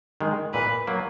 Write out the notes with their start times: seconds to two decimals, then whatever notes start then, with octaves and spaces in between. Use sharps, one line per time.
0.21 D#3 G#3
0.54 A#2 B4
0.87 F#3 A#3